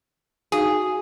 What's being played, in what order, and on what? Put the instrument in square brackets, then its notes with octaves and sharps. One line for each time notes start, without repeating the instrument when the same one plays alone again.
[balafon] D#4 F#4 F5 [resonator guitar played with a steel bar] G#4